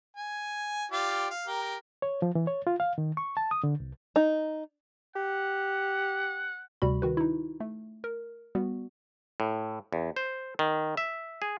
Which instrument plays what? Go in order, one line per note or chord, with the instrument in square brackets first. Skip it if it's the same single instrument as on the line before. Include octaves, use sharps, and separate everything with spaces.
[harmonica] G#5
F4 G4 D5
F5
G4 A#4
[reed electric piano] C#5
F3
E3
C#5
F4
F5
D#3
C#6
A5
D#6
D3
C2
[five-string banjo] D#4
[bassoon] G4 [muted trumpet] F#5
[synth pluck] D2 C3 G3 F#4 B5
D#3 F#4 B4
D#4 E4
A3
A#4
G3 B3 F#4
[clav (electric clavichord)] A2
E2
C5
D#3
E5
G#4